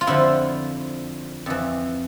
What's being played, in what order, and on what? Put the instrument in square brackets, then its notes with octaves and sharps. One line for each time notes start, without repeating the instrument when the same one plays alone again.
[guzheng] F4
F2 D3 F3 E4
F2 E3